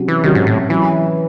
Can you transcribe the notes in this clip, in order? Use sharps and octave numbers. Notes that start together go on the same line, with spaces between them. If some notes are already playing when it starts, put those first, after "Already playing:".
Already playing: C3 F#3 C#4 F#4
E3
C3 D#3 F#3 C#4 F#4
G#2
A2
E3 F#3 C#4 E4